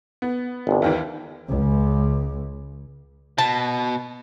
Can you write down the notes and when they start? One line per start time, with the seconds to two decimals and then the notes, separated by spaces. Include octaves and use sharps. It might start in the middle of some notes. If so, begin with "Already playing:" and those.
0.22 B3
0.67 G1 C2
0.82 D#2 D#3 E3
1.50 C#2
3.38 B2 A5